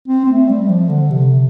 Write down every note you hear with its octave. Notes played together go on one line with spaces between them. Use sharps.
C4
C4
A3
G3
F3
D3
C3